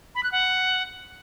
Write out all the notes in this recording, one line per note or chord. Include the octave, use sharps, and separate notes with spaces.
B5
F#6
F#5